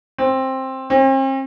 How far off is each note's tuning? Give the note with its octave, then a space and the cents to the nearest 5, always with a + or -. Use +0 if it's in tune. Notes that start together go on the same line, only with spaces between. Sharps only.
C4 +15
C4 +45